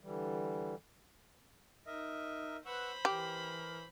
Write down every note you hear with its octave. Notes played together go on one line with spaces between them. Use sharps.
D3 E3 G3
D#4 A#4 D#5 E5
B4 C5 F#5 B5 C#6 E6
E3 G4 A#4